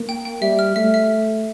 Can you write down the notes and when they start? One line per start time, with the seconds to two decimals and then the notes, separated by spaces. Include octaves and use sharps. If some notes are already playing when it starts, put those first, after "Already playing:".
Already playing: A#3
0.09 G5
0.25 G5
0.42 G3 E5
0.59 F6
0.76 A3 E5
0.94 E5